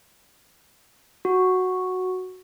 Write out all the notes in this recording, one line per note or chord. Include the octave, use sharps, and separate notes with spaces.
F#4